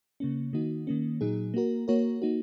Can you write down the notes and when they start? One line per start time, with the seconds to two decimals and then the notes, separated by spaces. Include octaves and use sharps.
0.20 C#3 A#3 C#4
0.53 D#3 A#3 D#4 F#4
0.87 D#3 A#3 C#4
1.21 A#2 F#3 D#4 G#4
1.54 A#3 F#4 A#4
1.88 A#3 F#4 A#4 C#5
2.22 A#3 D#4 F#4